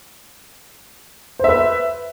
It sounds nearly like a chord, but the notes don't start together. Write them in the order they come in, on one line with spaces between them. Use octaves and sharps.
C5 E5 B4